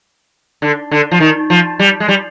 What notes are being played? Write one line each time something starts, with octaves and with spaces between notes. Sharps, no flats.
D3
D3
F3
D#3
F3
G3
G#3
G3